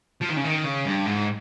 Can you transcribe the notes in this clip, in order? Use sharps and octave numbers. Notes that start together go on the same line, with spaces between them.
F3
D#3
C#3
D#3
C#3
G2
G#2